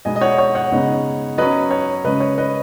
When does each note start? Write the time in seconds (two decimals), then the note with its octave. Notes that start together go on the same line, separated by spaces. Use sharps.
0.05 B2 G#3 B3 D#4 D#5 G#5
0.16 D#5
0.21 C#5 F#5
0.38 C#5
0.55 C#5 F#5
0.72 C#3 G#3 B3 D#4
1.38 F#3 C#4 B4 D#5
1.71 C#5
2.04 C#3 G#3 C#4 B4 D#5
2.20 C#5
2.38 B4 D#5